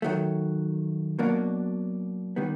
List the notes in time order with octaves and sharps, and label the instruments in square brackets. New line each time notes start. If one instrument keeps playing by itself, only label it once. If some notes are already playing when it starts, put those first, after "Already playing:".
[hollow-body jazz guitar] D#3 F#3 A3
B2 F#3 A#3 D4
D#3 G3 B3